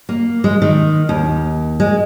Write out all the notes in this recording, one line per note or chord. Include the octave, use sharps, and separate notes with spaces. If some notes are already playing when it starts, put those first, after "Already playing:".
A#3
G#3
D#3
D#2
G#3